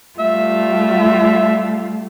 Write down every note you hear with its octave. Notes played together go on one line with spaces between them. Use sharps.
G3 A3 F4 E5